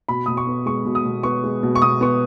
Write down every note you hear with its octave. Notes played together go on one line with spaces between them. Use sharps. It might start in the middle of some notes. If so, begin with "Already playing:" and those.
B2 B5
B2 D#6
C#6
B3
G#3 C#6
B2
D#6
B2
B3 C#6
G#3
B2
C#6
B2 D#6
B3 C#6